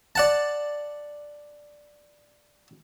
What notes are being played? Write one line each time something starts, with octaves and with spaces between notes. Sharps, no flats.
D5 F#5 A5